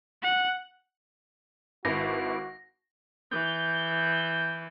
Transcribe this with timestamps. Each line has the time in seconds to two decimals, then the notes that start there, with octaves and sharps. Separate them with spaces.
0.23 F#5
1.85 G#1 E4 F#4 B4 D6 A#6
3.32 E3 G6